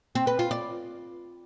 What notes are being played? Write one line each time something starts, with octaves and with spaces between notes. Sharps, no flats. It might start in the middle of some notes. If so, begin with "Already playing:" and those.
C4
B4
F4
D5